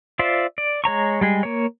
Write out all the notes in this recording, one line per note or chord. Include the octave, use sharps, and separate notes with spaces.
F4 C5 D5 E5
D5
G#3 C#5 A#5 C#6
G3 G#3 G#4
A#3 C#5